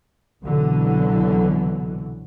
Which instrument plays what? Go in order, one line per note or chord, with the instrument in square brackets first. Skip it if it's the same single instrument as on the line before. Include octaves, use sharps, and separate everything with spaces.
[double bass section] C2 B2 D3 E3 F#3